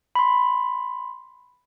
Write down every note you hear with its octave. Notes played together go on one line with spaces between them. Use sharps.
B5 C6